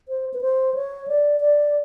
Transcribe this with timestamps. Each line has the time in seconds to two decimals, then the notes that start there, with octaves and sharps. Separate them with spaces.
0.08 C5
0.34 B4
0.41 C5
0.74 C#5
1.08 D5
1.41 D5